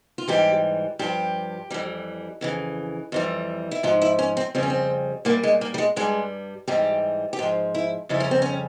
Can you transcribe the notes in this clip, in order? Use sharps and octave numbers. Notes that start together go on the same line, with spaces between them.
F4
G#2 E3 G3 G4
G2 F3 G4
F2 E3 G3
F2 C#3 E3
F2 E3 G3
E4
G#2 F3 F4
E4
C#4
C4
F2 C#3 G3 C4
C#4
C4
A#2 G3 A#3
G#3
A#3
G3
G#3
G2 G3 G#3
G#2 E3 G3 G4
G4
G#2 F3 F4
E4
F2 C#3 G3 E4
C#4
C4
C#4